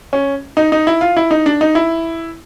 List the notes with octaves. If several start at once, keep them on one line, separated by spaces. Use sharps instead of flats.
C#4
D#4
D#4
E4
F4
E4
D#4
D4
D#4
E4